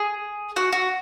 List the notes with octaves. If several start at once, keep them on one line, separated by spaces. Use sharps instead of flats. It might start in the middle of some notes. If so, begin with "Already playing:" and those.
Already playing: G#4
F#4
F#4